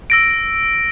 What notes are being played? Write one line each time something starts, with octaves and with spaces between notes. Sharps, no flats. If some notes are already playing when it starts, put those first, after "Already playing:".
E6 A#6 D7